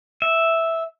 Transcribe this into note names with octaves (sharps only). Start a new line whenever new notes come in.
E5